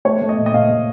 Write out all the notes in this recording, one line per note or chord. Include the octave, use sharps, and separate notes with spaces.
A3 C#5
A3
D#5
A#2
D#5
A#2 F5
A3